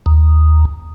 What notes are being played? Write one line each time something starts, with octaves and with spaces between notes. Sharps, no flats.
D#2